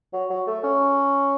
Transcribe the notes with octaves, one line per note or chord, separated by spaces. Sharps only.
F#3
F#3
A3
C#4